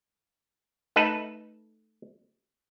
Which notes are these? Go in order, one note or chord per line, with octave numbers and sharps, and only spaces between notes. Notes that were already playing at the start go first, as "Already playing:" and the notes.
A3 D#4 A4 B4